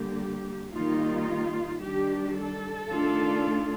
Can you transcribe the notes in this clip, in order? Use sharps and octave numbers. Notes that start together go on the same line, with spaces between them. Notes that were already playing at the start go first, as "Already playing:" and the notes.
Already playing: D3 G3 A#3 G4
D#3 G3 A#3 D#4 F4
D#3 G3 D4 G4
A4
D#3 A3 D4 F4